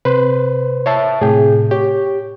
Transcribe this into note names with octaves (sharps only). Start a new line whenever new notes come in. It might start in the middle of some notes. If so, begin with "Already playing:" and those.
C3 B4 C5
C#5 E5 A5
A2 C3 G#4 G5
G4 C#5